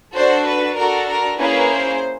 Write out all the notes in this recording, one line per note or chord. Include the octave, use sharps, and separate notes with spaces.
D4 F#4 A4 C5
B4
D4 F#4 A4 A#4
A#4
A#3 C#4 E4 G#4 B4
C5